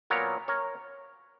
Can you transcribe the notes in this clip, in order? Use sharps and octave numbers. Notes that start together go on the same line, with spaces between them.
A#2 F#3 B3 A#4 C#5
A#4 C#5